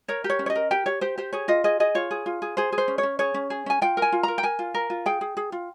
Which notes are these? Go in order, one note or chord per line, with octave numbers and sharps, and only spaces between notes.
A#4 C#5
G4
C#5
C#4
C#5
D#5
A#4
G4 G5
G4 C#5
G4 C5
G4 C5
G#4 C#5
F4 D#5
G#4 D#5
G#4 D#5
F4 C#5
G#4
F4
G#4
G#4 C5
G#4
C5
C#4
C#5
C#4
G#4 C#5
C#4
G#4
C#4 G#5
F4 G5
A#4
G#5
F4
A#4 A#5
G5
A#4 G#5
F4
A#4
F4
G#4 G5
G#4
G#4
F4